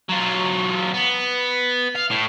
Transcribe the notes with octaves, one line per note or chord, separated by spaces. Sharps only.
F#3 F4
B3
F5
A2